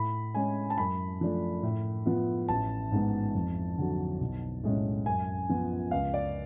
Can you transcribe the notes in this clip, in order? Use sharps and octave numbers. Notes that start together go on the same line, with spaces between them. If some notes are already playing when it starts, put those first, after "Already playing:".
Already playing: A2 B5
G#3 C#4 G#5
A5
F#2 B5
F3 A3 D4
A2
F3 B3 F4
A1 A5
G#2 G#3 B3
F2
D3 F#3
B1
A2 G#3 C#4
F#2 G#5
F3 B3 F4
C#2 F5
D5